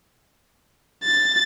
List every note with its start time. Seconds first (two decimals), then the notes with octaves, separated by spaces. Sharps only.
1.04 A6